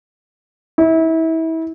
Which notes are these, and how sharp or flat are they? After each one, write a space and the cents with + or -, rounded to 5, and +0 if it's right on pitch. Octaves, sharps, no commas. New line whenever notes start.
E4 -30